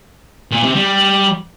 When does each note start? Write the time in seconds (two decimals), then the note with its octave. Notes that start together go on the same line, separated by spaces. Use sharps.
0.51 A#2
0.63 C3
0.75 G3